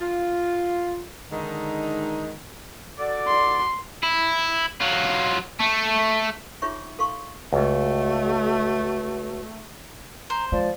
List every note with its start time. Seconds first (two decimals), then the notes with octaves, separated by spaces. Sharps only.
0.01 F4
1.31 D3 D#3 G#3 D#4
2.99 F#4 A4 D5
3.27 C6
4.03 E4
4.81 F#3 F4
5.59 A3
6.62 D#4 F4 G#4 C#5 E5 C#6
6.99 A4 F5 C6 C#6
7.53 C#2 A3 F#4
10.30 C5 A#5
10.52 F3 G#3 D5